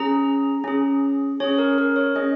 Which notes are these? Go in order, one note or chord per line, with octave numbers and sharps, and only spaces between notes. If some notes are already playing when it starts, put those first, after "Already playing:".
Already playing: C#4 G#4 A#5
C#4 G#4
C#4 G#4 C#5
A#4
A#4
C#5
C#4 G#4 D#5